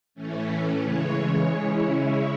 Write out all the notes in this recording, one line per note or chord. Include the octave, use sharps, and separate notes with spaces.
A2 E3 A3 C#4
C#3 E3 G#3 C#5
C#3 G#3 C#4 E4